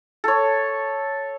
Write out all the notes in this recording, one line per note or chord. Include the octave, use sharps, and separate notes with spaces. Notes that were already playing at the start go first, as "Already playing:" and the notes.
A4 C#5